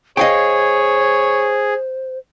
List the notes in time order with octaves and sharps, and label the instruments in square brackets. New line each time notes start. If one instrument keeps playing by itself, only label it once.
[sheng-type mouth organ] G#4 [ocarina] C5 [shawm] C#5 [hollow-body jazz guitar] D#5 F5 G5